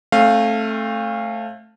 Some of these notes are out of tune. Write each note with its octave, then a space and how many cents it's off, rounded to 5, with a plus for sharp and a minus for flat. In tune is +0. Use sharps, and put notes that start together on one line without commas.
A3 +0 C4 +45 F5 +0